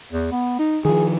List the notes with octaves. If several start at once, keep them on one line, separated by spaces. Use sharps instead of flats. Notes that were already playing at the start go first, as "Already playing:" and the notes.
E2
B3
D#4
D#3 F3 G#4